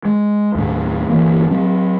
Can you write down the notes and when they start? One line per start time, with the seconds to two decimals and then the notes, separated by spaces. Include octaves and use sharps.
0.05 G#3
0.55 D#2 A2
1.10 G1 E3 A#3
1.50 F#3 C4